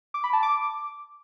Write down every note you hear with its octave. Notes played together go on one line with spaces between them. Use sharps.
D6
B5
A5
D6